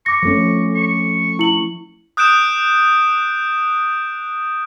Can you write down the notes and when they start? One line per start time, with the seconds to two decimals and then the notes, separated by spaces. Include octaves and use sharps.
0.06 C#6 D6 A#6
0.23 F3 A3 C#4
0.75 C#6
1.39 E4 F#7
2.17 D#6 F#6 G6 D7 E7